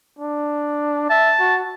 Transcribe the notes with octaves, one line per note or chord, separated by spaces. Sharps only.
D4
E5 A5
F#4